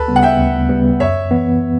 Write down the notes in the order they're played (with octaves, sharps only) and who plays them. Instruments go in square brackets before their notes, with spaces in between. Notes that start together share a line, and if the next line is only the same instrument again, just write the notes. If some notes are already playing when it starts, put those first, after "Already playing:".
Already playing: [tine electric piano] D2 [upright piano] A4 B4
[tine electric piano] C#3 G3 B3
[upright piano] F#5
E5 G5
[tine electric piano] D2
C#3 G3 B3
[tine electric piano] F#2 [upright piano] C#5 E5
[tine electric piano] E3 B3